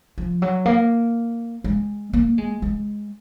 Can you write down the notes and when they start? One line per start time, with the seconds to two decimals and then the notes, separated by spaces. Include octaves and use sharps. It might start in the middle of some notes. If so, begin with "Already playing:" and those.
0.18 F3
0.42 F#3
0.66 A#3
1.64 G#3
2.13 A#3
2.38 G#3
2.62 G#3